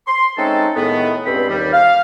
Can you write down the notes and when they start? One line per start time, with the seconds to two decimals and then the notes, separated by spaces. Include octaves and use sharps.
0.06 C6
0.37 G#3 A3 C4 C#4 D#4 A4
0.76 A2 D#3 G#3 A3 B3
1.25 C#2 G2 C4 B5
1.48 D#2 G3
1.72 F5